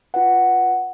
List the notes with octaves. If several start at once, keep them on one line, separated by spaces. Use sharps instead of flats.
F4 B4 F#5